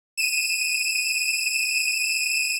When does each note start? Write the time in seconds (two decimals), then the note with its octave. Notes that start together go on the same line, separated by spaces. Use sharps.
0.17 D#7 E7